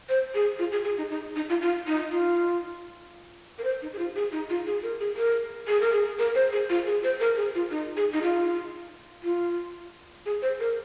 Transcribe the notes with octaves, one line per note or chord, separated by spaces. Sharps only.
C5
G#4
F4
G#4
G#4
D#4
D#4
D#4
F4
F4
D#4
F4
A#4
C5
D#4
G#4
F4
G#4
D#4
F4
G#4
A#4
G#4
A#4
G#4
A#4
G#4
A#4
C5
G#4
F4
G#4
C5
A#4
G#4
F4
D#4
G#4
D#4
F4
F4
G#4
C5
A#4